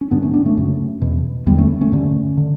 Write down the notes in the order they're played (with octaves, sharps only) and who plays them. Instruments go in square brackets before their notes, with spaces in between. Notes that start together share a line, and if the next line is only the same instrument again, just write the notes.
[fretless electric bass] C#4
G2 D3 B3 D4
A3 C#4
B3 D4
A3 C#4
F#2 C#3
E2 B2
E2 D3 G3 B3
A3 C#4
A3 C#4
G2 D3
D3